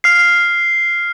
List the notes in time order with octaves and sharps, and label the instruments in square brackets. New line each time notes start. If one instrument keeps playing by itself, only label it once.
[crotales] F6 C7